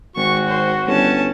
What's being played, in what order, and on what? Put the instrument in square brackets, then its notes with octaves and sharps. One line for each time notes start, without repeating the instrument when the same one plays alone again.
[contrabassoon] G#1 [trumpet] F#4 [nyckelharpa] C#6
[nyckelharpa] C5
[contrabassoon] G1 [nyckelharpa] C#4 A5